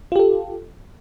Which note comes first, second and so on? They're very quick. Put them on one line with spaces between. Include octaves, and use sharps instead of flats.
F4 G4 A4